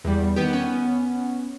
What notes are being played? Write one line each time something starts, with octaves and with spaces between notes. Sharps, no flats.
E2 G3
D#3 B3 G4
B3 C#4